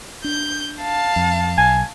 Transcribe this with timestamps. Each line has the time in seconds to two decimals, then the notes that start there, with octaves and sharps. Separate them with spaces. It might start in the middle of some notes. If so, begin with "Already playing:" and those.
0.24 D4 G6
0.82 F5 A5
1.16 F2
1.58 B1 G#5